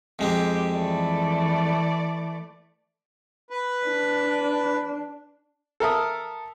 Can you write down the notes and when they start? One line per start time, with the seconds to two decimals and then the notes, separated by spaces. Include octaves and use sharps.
0.19 F2 G#3 C4 G4
0.71 E3 A3 D5
3.50 B4
3.86 D4
5.80 A4 A#4 E5 D#6